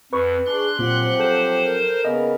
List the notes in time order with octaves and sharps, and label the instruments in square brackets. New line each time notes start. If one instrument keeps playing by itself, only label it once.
[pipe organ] F2 [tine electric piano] B4 C#6
[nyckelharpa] D4 [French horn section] G#4 [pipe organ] C6 F#6
[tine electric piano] A#2 [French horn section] F3 F#3 C4 [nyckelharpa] G4 F#5
[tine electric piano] A4 [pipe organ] C5
[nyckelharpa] A#4
[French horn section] C#3 A#3 B3 [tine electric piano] D#5